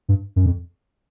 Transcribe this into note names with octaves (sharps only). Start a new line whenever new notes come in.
G2
F#2
F2